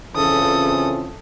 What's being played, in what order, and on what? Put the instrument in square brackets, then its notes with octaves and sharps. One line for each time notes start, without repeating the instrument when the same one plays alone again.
[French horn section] F2 C#3 E3 [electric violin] A4 D#6